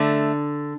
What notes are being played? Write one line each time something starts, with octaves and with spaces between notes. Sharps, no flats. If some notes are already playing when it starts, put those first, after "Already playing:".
Already playing: D3 A3